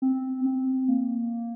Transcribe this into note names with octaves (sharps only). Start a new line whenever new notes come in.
C4
C4
A#3